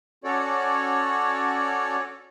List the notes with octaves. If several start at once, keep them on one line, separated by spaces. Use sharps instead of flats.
C#4 F#4 A4 C#5 D5